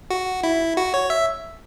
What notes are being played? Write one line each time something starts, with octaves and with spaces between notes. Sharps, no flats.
F#4
E4
F#4
C#5
E5